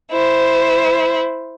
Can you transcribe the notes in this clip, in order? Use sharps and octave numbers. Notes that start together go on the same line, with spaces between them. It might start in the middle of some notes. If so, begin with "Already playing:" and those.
E4 C5